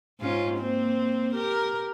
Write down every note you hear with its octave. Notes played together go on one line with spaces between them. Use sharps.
G#2 C#4 F4
A#3 C4
G4 A#4